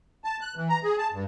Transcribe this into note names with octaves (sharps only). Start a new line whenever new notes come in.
A5
F#6
E3
A#5
G#4
A5
G2